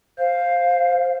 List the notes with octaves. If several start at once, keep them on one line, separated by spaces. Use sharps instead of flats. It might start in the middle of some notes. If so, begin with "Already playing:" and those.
C5 F5